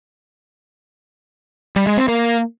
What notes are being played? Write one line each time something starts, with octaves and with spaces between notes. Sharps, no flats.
G3
G#3
C4
A#3